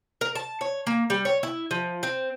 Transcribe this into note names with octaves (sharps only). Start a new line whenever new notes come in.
A#4
A5
C#5
A#3
G3
C#5
E4
F3
C4